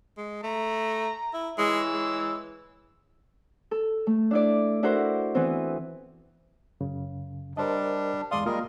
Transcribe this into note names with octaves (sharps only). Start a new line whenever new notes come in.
G#3
A3 A#5
E4
E3 G#3 C#5 E6
G#3
A4
A3
D4 E4 D5
D4 E4 F#4 A4 A#4 C5
E3 B3 C4
F#2 C#3
G3 D4 A#4 C5 D#5
E2 G#3 D5 F5 C6 D#6
G3 G#3 A#3 F4 A#4 D#6